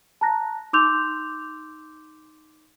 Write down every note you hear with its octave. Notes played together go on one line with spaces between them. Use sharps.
A5 A#5 F#6 A#6
D#4 C6 D6 E6 G6 F7